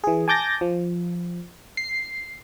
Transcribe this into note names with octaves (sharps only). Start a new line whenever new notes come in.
E3 G#4
G#5 A5 D6 G6 A6 A#6
F3
C7